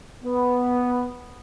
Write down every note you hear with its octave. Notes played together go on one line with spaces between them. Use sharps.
B3